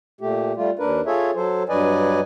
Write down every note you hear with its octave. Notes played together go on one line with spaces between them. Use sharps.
A#2 A3 G4
G3 A3 F4
D#2 D4 A#4 B4
F4 G#4 A4 C#5 E5
F#3 A4 C5
G2 F#3 B4 D5 D#5 G#5